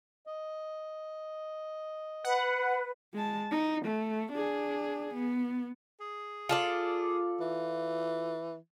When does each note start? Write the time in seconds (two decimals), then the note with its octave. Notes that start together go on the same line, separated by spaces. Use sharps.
0.27 D#5
2.24 B4 F#5
3.14 G#3 A5
3.51 D#4
3.85 A3
4.32 D4 G#4
5.14 B3
6.01 G#4
6.49 F4 A4 D5
7.40 E3